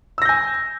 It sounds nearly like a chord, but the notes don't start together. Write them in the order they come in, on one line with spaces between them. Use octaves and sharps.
E6 A#6 G6 G#5